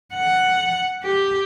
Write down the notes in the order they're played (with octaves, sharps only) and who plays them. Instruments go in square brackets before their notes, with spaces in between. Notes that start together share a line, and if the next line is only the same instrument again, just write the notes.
[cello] F#5
G4